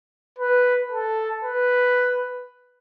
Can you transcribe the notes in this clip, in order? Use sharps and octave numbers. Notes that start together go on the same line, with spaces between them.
B4
A4
B4